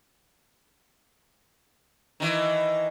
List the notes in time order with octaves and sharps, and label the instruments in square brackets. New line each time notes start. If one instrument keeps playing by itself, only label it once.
[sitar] D#3 E3